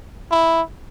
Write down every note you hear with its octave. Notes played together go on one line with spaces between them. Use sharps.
E4